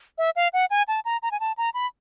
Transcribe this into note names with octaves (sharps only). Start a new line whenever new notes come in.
E5
F5
F#5
G#5
A5
A#5
A#5
G#5
A5
A#5
B5